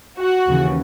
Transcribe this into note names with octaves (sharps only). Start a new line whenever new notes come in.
F#4
D#2 C#3 E3